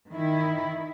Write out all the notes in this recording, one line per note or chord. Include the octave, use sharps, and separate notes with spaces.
D#3 E4